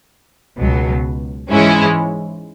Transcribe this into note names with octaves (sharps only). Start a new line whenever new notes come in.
C#2 B2 F#3
G#2 E3 G#3 C#4 E4